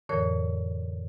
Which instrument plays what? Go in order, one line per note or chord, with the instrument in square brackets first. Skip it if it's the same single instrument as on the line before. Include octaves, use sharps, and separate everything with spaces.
[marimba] F2 A2 D3 E3 A#4 C#5